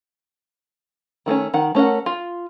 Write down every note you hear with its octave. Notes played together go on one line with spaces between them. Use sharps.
D#3 A3 C4 C#4
D#3 F#5
A3 C#4 A#4 F#5
F4